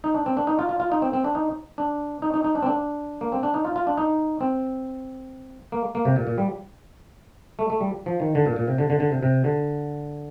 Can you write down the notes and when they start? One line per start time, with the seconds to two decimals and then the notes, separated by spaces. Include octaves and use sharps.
0.04 D#4
0.14 D4
0.26 C4
0.37 D4
0.47 D#4
0.59 F4
0.69 F4
0.80 F4
0.92 D#4
1.02 C4
1.13 C4
1.24 D4
1.35 D#4
1.78 D4
2.22 D#4
2.34 D#4
2.44 D#4
2.55 D4
2.62 C4
2.66 D4
3.21 A#3
3.32 C4
3.43 D4
3.54 D#4
3.65 F4
3.76 F4
3.87 D4
3.97 D#4
4.41 C4
5.72 A#3
5.95 A#3
6.05 C3
6.16 A#2
6.27 A#2
6.38 G3
7.59 A3
7.70 A3
7.81 G3
8.06 F3
8.20 D#3
8.35 D3
8.46 A#2
8.56 A#2
8.68 C3
8.78 D3
8.90 D3
9.00 D3
9.12 C3
9.23 C3
9.44 D3